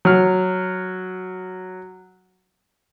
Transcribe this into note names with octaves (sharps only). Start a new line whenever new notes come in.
F#3 F6